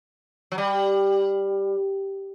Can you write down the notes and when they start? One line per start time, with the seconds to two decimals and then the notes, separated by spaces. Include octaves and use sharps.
0.52 F#3
0.58 G3